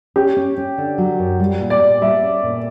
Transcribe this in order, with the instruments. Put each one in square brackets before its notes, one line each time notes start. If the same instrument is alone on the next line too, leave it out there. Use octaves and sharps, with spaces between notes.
[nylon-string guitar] C#4 [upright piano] G4
[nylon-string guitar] C#4
C#4
D3
F#3
F#2
G3
A#2
[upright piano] D5
[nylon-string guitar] A#2
[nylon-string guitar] G3 [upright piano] E5
[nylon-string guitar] C#4
A#2